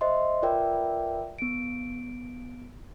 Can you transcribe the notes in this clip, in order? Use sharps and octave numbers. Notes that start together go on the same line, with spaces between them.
C5 D#5 E5 C6
F4 A#4 B4 D5 E5 G5
B3 D7